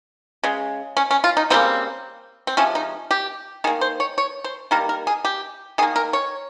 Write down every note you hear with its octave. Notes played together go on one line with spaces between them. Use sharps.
C#3 G#3
C#4
C#4
F4
D#4
C#3 G3 A#3 C4
C4
C3 F3 G#3 C#4
D#4
G4
D#3 A#3 G#4
C5
C#5
C#5
C5
D#3 G3 A#3 A#4
A#4
G#4
G4
D#3 A#3 G#4
A#4
C#5